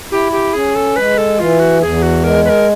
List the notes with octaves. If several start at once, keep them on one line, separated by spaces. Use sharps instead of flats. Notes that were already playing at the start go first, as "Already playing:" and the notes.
E4 G4
G4
C#4 G#4
A4
G#3 B4
A4
E3 F4
F#4
E2 G#4
F#4
G#3 A#4
B4
A#4